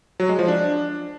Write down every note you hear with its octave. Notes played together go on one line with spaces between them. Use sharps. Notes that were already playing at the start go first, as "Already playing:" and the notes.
F#3
G#3
F3
D4